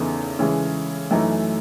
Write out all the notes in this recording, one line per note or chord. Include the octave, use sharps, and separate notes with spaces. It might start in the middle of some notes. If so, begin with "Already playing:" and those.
Already playing: E2 C#3 E3 B3 D#4 A4
C#3 E3 G#3
F#2 E3 A3 D#4